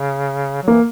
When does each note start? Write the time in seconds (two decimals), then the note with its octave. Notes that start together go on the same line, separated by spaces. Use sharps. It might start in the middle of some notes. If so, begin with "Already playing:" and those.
Already playing: C#3
0.63 F#3
0.68 E3 A#3